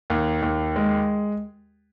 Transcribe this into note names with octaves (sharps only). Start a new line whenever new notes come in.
D#2
D#2
G#3